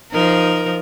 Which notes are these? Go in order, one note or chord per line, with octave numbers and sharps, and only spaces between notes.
F3 D#4 A#4